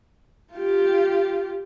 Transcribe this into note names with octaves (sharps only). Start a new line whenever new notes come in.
F4 G4